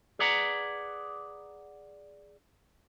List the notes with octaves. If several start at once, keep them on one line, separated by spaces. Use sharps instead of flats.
G#4 B4 D5 F#5 A#5